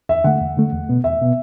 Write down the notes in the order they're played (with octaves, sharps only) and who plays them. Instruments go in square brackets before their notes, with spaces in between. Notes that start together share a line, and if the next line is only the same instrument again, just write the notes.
[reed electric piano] E2 [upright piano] E5
[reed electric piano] D3 A3 [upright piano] F#5
[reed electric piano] E2
D3 A3
E2
B2 B3
[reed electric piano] E2 [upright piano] E5
[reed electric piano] B2 B3